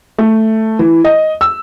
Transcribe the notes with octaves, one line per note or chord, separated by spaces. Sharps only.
A3
E3
D#5
E6